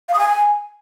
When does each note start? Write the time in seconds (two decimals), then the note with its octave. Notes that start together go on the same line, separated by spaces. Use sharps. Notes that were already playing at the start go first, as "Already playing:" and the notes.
0.08 F5
0.14 D#6
0.19 G#5